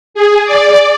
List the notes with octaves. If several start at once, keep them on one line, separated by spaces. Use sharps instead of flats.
G#4
D5